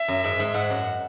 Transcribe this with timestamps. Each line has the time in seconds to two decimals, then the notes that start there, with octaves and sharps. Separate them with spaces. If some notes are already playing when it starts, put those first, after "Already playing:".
Already playing: E5
0.08 F#2
0.24 G#2
0.39 G#2
0.54 G#2 F#5
0.70 F#2